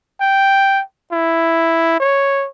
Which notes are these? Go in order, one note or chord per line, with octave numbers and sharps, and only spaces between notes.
G5
E4
C#5